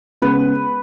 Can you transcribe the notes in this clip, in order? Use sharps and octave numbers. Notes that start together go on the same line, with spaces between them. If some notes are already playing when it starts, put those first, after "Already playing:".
C#3 G#3 B3 B4